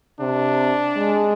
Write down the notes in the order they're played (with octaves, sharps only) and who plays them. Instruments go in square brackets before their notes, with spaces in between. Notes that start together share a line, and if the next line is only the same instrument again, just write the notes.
[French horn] C3 [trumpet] D4
[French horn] G#3